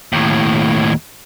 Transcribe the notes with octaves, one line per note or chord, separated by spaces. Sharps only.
D#2 A2